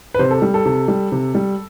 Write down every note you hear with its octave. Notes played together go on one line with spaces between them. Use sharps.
B4
C3 C5
A4
G3
A4
C3
G3
C3
G3